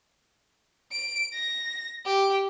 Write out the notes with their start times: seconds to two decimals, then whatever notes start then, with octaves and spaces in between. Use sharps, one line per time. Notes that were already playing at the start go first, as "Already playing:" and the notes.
0.92 D7
1.34 A#6
2.06 G4